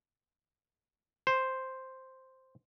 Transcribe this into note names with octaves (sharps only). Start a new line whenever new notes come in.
C5